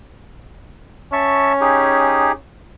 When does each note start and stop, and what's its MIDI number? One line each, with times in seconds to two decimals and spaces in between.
1.13 2.36 61
1.13 1.53 76
1.13 1.53 81
1.13 1.53 85
1.61 2.32 63
1.61 2.32 67
1.61 2.32 68